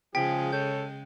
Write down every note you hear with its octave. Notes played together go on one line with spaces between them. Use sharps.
C#3 F3 G#3 G#4 G5 B6
A4 C#5 G6